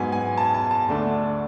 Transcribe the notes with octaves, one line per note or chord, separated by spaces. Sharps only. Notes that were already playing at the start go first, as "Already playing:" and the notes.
Already playing: G#2 F#3 B3 G#5
G#5
A5
A5
A5
D2 D3 A3 D4